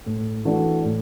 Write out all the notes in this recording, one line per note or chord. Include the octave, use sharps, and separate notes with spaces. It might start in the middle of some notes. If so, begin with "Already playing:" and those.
A2
E3 A3 D4 F#4
A2